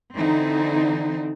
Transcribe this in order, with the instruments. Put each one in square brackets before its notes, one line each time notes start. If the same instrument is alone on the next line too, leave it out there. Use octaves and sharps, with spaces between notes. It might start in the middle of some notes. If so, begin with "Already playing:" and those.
[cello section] D3 E3 C4 D#4